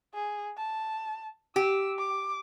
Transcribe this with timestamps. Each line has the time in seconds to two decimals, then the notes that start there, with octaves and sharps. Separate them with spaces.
0.14 G#4
0.57 A5
1.56 G4 E6
1.98 D6